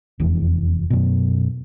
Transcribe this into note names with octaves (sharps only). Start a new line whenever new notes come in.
F1 E2
F#2 B2